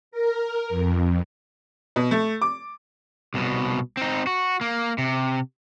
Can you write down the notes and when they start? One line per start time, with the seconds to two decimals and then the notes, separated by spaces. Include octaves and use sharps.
0.11 A#4
0.69 F2
1.96 B2
2.11 A3
2.42 D6
3.34 C2 B2
3.97 C4 D#4
4.27 F#4
4.61 A#3
4.98 C3